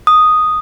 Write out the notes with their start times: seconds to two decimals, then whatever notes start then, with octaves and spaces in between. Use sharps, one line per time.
0.07 D#6